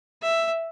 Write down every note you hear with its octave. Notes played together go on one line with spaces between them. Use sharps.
E5